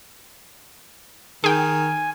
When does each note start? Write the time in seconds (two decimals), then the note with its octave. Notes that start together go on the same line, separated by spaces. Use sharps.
1.44 D#3 G#4 G5 G#5